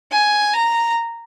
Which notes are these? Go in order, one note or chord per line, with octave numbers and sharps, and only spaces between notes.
G#5
A#5